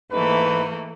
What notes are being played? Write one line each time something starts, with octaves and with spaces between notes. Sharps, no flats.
G#2 E3 A3 A#3 B4